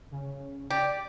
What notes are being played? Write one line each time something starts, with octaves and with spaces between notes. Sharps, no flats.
C#3
G4 D5